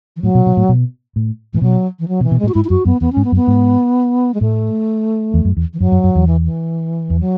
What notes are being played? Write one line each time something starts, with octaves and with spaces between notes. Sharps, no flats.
E3
A2 F#3
B2
B2
A2
B2
A2
A2 E3
B2 F#3
E3
F#3
B2
E3
B2
A2 G#3
F#4
G#2 E4
E4
F#2 F#4
F#2 B3
E2 B3
G#2 C#4
B3
F#2
B3
G#2
G#3
A2 A3
E2
F#2
E2
E3
F#2 F#3
F#2
F#2
E2
E3
E3
E2
F#3